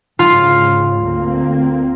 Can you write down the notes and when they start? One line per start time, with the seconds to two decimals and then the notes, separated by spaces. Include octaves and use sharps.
0.19 G#2 C#3 F4
1.03 D2 A#3 C4